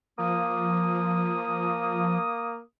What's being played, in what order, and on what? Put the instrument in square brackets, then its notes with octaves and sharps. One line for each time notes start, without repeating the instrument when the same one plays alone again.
[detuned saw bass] F3 [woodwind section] A#3 D#6